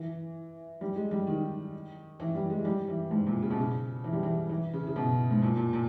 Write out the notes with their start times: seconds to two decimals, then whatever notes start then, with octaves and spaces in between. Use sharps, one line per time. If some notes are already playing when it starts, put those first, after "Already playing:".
Already playing: E3
0.81 G3
0.96 G#3
1.11 G3
1.27 D#3
2.20 E3
2.35 G3
2.50 G#3
2.65 G3
2.88 E3
3.11 G#2
3.27 A#2
3.42 C#3
3.51 B2
3.58 C#3
4.04 E3
4.13 G3
4.23 E3
4.49 E3
4.73 C#3
4.87 C#3
4.96 B2
5.31 G#2
5.42 A#2
5.57 A#2
5.73 A#2